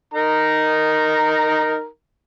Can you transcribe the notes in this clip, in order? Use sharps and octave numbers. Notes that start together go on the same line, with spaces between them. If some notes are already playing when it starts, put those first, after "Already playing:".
D#4 A#4 A#5